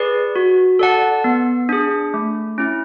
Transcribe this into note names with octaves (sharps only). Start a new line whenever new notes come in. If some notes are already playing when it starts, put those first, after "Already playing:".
Already playing: G#4 B4 D5
F#4
A4 D5 F#5 A5
B3
D4 G#4
A3
C#4 E4